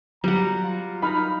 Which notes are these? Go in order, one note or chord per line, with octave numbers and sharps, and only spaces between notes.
F#3 G3 F#5 A#5
F4
D#4 A#5 B5 F6